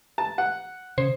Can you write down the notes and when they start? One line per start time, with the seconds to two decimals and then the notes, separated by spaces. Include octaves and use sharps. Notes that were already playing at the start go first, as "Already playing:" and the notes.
0.18 A5
0.38 F#5
0.98 C#3 C5